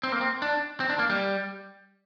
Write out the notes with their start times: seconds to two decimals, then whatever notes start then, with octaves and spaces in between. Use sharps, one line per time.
0.03 C4
0.12 A#3
0.21 C4
0.42 D4
0.80 C4
0.90 D4
0.99 A#3
1.10 G3